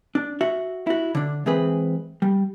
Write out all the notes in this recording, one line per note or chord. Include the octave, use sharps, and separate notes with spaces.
D4
F#4 E5
E4 F#4
D3 D4
E3 G#3 C4 G#4 B4
G3